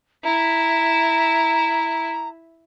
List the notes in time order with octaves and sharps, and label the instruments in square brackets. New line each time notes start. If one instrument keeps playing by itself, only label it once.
[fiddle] E4 E5 [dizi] A#5